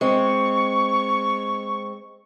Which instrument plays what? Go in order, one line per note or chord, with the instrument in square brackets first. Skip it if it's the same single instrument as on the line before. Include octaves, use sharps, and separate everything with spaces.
[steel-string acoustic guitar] G#3 C4 [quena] C#6